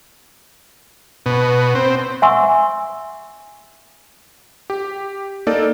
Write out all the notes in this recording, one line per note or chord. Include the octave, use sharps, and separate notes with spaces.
B2
C4
E5 F#5 G#5 C6 C#6 E6
G4
A#3 D#4 A4 D5